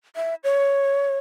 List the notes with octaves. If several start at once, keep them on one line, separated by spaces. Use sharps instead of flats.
E5
C#5